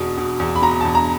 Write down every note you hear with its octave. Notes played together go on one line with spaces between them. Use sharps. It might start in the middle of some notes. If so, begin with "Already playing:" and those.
Already playing: E2 B2
B2
E2
B5
B2 A#5
E2 A5
A#5